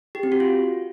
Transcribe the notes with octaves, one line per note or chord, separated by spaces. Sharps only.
G4
C4
F#4
F4